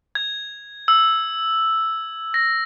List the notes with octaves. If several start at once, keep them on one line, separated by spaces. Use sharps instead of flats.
G#6
E6
A#6